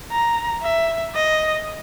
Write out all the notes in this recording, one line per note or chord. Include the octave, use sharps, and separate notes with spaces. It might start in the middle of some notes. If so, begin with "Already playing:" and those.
A#5
E5
D#5